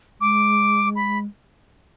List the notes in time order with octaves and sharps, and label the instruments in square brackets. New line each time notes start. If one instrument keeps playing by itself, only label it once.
[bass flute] G#3 [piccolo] D6
[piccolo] B5